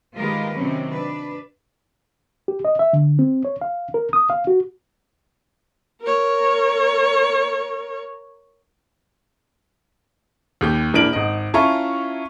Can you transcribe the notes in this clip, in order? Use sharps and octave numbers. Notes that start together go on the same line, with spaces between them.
D#3 G#3 F4 G4 A#4 B4
C3 D#3 F#3 C4 C#4
D4 B4
G4
D#5
E5
D3
C4
C#5
F5
A#4
D#6
F5
F#4
A#4 C#5
D#2 G4 G6
A#1 E3 D4 A#4 D7 F#7
G#1 D#5
C#4 E4 F4 A5 A#5 C#6